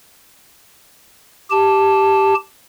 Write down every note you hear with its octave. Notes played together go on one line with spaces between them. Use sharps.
G4 A5